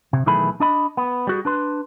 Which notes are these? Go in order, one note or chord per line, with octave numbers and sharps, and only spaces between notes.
C3
B1 D#3 E3 A3 G#4 B5
D4 D#5 B5
B3
G3 F#4 G#4
D4 B4 C6